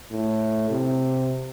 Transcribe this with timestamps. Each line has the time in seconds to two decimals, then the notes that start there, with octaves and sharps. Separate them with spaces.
0.11 A2
0.70 C3